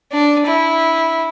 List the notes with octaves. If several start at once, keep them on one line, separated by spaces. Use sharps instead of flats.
D4
E4